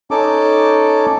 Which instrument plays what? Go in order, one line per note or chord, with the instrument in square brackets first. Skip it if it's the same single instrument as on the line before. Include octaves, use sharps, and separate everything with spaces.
[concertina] C#4 D#4 A4 D6